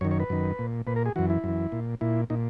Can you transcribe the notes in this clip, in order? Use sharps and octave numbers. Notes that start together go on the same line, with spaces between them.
F#2 D#3 C#5
C#5
B4
F#2 D#3
A#2
A#2 B4
A#4
G#4
F#2 E3 F#4
E4
F#2 E3
A#2
A#2 E4
A#2 D#4